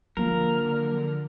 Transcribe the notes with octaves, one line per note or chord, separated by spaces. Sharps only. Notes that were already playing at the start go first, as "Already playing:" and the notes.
D3 F3 F#3 A#3 A#4